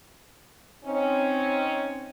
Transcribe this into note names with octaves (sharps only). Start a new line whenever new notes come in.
C4 C#4 D#4